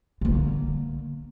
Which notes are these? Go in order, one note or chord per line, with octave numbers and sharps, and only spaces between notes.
D3 A#3